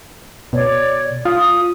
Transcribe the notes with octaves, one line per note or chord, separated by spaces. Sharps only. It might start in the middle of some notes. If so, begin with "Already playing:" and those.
B2 C#5 D5
F4 D#6